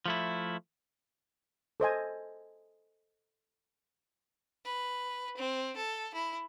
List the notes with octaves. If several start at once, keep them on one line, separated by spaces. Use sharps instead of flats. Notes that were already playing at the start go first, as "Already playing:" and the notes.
F3 A3 E4
A4 C5 D#5 G#5
B4
C4
A4
E4